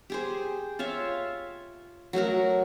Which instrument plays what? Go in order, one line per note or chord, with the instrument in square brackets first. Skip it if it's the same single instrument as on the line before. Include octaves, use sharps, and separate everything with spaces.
[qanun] G4 G#4 C5
F4 C#5 E5 F5
F#3 A3 F#4 A#4